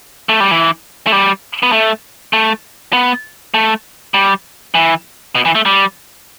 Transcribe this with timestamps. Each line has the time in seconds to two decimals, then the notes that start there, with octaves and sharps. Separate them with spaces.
0.29 A3
0.40 G3
0.51 E3
1.07 A3
1.12 G3
1.63 B3
1.72 A3
2.33 A3
2.93 B3
3.54 A3
4.14 G3
4.75 E3
5.35 B2
5.45 E3
5.55 A3
5.66 G3